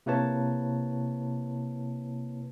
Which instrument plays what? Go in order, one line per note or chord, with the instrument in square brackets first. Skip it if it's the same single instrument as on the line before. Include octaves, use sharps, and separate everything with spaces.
[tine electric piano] C3 A#3 E4 B4 C#5 A5